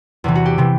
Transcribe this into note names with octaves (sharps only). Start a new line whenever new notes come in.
E2 C3 E3
F#4
G4
C3 E3